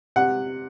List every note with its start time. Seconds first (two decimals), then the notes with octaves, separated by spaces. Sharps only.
0.16 C3 F#5